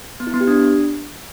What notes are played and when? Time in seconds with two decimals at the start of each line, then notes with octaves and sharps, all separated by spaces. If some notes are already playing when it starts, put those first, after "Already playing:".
0.20 B3
0.27 E4
0.34 B3
0.41 G4
0.47 D4